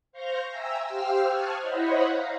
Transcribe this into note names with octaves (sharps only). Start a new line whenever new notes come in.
C5 F5 C#6 F6 G6 A#6
E5 G5 G#5 A#5 E6
G4 C5 F5 G5 E6 F6
A5 C#6 D#6 F6 F#6 G#6
E4 C5 C#5 D#5 F#5 B5
F5 A#5